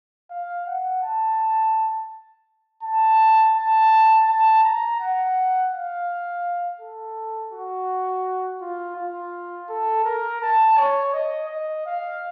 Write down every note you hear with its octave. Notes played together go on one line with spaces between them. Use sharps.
F5
F#5
A5
A5
A5
A5
A#5
F#5
F5
A4
F#4
F4
F4
A4
A#4
A5
C#5
D#5
D#5
F5